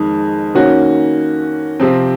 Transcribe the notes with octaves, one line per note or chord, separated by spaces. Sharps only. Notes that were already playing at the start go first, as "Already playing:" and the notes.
Already playing: F2 D#3 G#3
D#3 A#3 C#4 F#4
C3 F3 C4